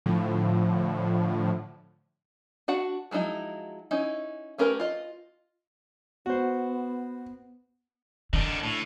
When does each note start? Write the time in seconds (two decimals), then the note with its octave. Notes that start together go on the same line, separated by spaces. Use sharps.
0.06 A2 D3 F3
2.68 D4 F#4 F#5
3.11 F3 F#3 G#3 D#4 E4
3.91 C#4 D#4 E4
4.58 A3 C#4 G4 A#4 B4
4.80 F4 D#5
6.26 B3 F#4 C5
8.33 D3 D#3 D4
8.63 A2